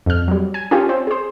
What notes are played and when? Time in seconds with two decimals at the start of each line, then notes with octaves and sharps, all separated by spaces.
0.06 F2 F6
0.28 F#3 G3
0.54 G#5
0.71 C#4 F4 G4
0.89 C4
1.07 G#4 C5